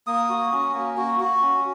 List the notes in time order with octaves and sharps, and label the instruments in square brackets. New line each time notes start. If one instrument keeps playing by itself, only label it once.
[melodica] A#3 D#6
F#4
C#4
A#3
F#4
F#4
C#4